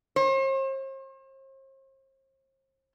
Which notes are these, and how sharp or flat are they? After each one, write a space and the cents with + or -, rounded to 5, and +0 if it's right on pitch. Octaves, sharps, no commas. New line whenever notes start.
C5 +40